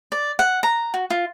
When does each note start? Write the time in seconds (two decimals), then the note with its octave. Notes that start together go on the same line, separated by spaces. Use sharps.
0.12 D5
0.39 F#5
0.63 A#5
0.94 F#4
1.10 F4